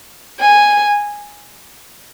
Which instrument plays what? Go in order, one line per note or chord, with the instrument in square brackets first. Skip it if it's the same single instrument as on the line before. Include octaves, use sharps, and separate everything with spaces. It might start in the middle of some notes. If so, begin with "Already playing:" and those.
[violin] G#5